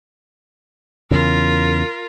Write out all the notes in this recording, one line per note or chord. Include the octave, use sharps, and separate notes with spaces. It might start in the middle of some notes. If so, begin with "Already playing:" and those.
E2 C#3 F4 A#4